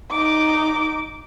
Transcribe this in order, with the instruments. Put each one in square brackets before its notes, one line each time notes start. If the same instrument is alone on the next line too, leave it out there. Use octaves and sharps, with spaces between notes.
[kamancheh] D#4 D6